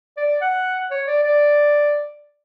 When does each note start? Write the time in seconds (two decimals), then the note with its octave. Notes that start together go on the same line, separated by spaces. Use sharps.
0.17 D5
0.41 F#5
0.91 C#5
1.07 D5
1.23 D5